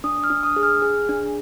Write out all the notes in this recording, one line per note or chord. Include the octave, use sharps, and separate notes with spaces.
D4 D#6
F6
D4
D#6
G#4
F6
G#4
D4